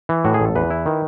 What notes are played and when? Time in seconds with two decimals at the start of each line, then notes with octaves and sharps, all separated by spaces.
0.09 E3
0.25 A2 F#4
0.34 G#4
0.40 A1
0.45 A4
0.55 E2 B4
0.70 E4
0.86 D#3